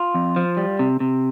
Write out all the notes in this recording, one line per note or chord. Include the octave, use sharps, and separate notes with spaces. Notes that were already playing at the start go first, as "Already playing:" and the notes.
Already playing: F4
F2
F3
G3
C3
C3